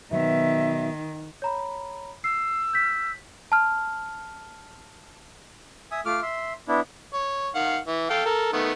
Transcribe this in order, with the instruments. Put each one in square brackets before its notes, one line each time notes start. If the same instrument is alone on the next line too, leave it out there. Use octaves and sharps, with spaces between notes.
[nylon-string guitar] B2 F#3 B3 [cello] D#3 [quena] E5
[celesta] C#5 A#5 B5
[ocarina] E6 [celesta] C7
[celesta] G6 B6
A5 F6
[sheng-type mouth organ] E5 G#5 D#6
A3 F4 D6 F6
E5 C6
B3 D4 E4
[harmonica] C#5
D#3 F5 F#5
E3
A4 F5 G5
A4 A#4
D#3 A3 B3